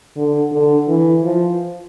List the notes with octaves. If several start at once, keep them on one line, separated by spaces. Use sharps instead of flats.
D3
D3
E3
F3